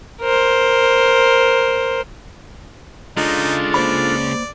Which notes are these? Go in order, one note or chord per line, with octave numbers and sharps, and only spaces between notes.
A#4 C5
C#3 G#3 D4 D#4 F4 A4
A#3 C5 D5 B5